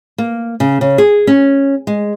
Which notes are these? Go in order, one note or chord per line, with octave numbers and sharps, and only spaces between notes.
A#3
C#3
C#3
G#4
C#4
G#3